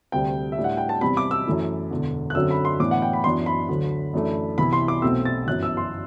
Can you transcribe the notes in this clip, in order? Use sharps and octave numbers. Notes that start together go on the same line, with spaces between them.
D2 C3 G3 G5
E5
A2 G3 D4
F#5
G5
A5
E2 C3 G3 C4 B5
D6
E6
F#2 E3 A3 E4
E1 E2 D3
F#6
F#2 D3 F#3 C4 E6
B5
C6
A2 E3 B3 D4 D6
F#5
G5
B5
F#2 E3 B3 D4 C6
B5
D2 D3 F#3
F#2 E3 A3 D4
C2 C3 E3 B3 E4 B5
C6
D6
B1 B2 A3 C4 E6
A6
G1 F#2 E3 F#6
E6
C6